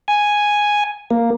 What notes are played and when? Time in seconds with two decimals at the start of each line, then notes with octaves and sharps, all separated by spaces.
0.08 G#5
1.11 A#3